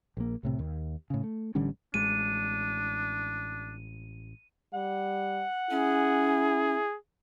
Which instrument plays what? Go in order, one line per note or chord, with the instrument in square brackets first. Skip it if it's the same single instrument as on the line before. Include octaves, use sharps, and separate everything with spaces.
[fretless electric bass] A#1 A#3
C2 A2 C3
D#2
A2 C#3
A3
A1 D3 G3 C#4
[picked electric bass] A1 G#3 [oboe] D4 [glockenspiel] D#7
[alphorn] G3 [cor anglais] F#5
[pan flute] C#4 [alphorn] E4 [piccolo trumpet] G#4